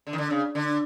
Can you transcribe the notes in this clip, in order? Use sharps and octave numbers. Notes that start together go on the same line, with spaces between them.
D3
D#3
D3
C#3
D3